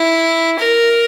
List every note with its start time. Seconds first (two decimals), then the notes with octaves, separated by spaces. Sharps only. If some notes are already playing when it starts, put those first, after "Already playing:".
Already playing: E4
0.58 A#4